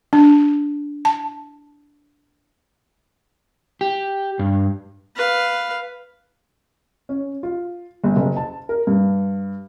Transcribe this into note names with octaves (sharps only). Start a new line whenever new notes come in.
D4
A5
G4
G2
B4 F5
C#4
F4
G1
F#1
A5
A#4
G2